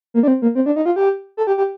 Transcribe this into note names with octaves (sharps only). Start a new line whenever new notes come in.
A#3
D4
C4
A#3
C4
D4
D#4
F4
G4
A4
G4
G4